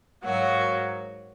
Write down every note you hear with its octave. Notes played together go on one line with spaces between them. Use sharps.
G#2 F#3 A#3 F#4